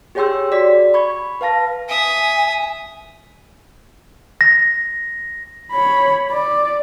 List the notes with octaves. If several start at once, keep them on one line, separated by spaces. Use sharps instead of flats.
G4 G#4 C#5 G5 C6 E6
F#4 D5 B6
B5 C#6 G#6
B4 F5 A5 A#6
E5 G#5 D#6
A#6
C#5 B5
D5